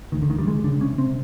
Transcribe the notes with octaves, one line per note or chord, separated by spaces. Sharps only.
D2 D#3
D3
D2 D#3
G3
C#3 G#3
C#3 D4
C3 C#4
C3 C4